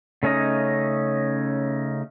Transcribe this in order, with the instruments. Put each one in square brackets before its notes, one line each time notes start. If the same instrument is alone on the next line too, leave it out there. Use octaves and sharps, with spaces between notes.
[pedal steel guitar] C#3 A3 C#4 D#4 D#5